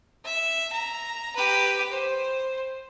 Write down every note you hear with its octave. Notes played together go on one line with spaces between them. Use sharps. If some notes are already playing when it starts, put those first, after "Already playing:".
E5
A#5
G4 B4
C5